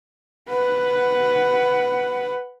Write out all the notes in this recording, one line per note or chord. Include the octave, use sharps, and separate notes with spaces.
B4 F#5